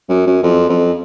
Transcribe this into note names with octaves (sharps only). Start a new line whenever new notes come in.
F#2
F#2
F2
F2